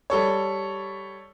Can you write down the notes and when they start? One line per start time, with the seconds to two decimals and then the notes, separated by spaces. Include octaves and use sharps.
0.10 G3 A4 C#5